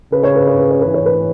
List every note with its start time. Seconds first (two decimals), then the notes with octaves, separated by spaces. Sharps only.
0.12 C#3 B4
0.23 C#5
0.36 B4
0.47 C#5
0.59 B4
0.71 C#5
0.82 E3 B4
0.94 C#5
1.06 B4